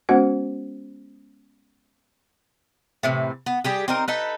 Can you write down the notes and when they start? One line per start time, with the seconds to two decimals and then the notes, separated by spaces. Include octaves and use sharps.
0.09 G#3 B3 C#4 F#4 C5 F#5
3.03 A2 C3 E3
3.46 B3
3.64 G3 G4 G#4
3.88 C4 D#4 A#4
4.08 D#4 A4 B4